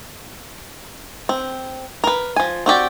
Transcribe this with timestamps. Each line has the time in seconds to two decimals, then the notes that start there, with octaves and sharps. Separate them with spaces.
1.29 C4
2.04 A#4 B4
2.36 F3 G#5
2.66 C4 F#4 G4 D5